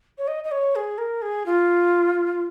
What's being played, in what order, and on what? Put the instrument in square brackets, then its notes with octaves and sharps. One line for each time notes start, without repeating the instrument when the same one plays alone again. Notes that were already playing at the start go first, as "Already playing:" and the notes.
[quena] C#5
D#5
D#5
C#5
G#4
A#4
G#4
F4